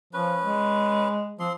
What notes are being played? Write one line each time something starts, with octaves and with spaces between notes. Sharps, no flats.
F3 C#4 B4
G#3
F3 C4 C6